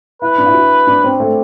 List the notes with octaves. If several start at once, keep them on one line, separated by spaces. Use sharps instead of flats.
E4 B4
D4
E4
F#4
D4
C4
A3